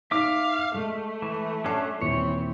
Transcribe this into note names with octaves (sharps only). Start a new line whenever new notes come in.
D#4 E5 F5 D6 E6
G#3 A3
E3
F#3 C#4 D4 A5 C7
D#1 E3 C4 C#5